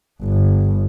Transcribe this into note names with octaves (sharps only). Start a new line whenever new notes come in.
G1